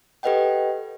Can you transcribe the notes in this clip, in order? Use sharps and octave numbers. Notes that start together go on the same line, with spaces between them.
G4 A4 B4 D#5 F#5 G5